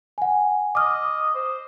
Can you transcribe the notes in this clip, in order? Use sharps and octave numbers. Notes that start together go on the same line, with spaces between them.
F#5 G#5
D#5 D6 F6
C5